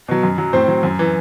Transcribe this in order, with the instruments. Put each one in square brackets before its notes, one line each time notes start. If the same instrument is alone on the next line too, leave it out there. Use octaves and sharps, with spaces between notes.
[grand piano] B2 F#3
F#2
F#3
A2 C4 C5
F#3
F#2
E3